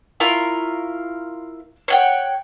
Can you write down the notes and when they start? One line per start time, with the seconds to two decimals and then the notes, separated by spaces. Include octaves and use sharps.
0.20 E4 F4 A#4 C#6
1.88 C#5 F#5 G5